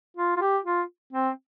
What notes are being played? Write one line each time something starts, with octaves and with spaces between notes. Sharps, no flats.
F4
F4
G4
F4
C4